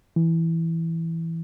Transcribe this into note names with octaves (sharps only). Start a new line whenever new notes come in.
E3